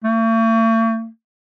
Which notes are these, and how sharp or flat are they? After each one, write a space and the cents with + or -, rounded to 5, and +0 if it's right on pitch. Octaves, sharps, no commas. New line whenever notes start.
A3 +45